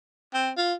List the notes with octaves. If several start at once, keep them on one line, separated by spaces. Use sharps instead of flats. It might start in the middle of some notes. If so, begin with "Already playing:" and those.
C4
F4